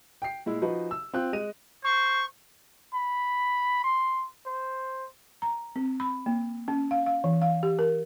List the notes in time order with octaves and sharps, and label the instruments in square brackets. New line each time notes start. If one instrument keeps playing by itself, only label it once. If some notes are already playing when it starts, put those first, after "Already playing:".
[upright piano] G5 C7
A#2 G#3 E4
F3 D#4 F#4 B4
E6
C4 F4 F#6
G#3 D#5 D#7
[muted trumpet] C5 [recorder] C#6
[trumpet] B5
C6
C5
[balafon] A#5
C4
B5
A#3
C#4
F5
F5
E3
F5
G4
A#4